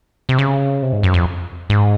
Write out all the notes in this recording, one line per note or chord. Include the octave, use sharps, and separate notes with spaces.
C3
C#3
C3
G#2
F#2
F2
G#2